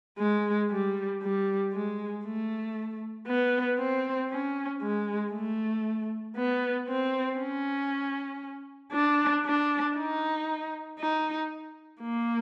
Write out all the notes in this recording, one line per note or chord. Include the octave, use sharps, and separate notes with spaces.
G#3
G3
G3
G#3
A3
B3
C4
C#4
G#3
A3
B3
C4
C#4
D4
D4
D#4
D#4
A#3